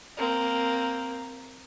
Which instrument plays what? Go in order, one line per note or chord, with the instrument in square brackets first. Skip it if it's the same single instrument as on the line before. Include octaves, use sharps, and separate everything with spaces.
[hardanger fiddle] A#3 C4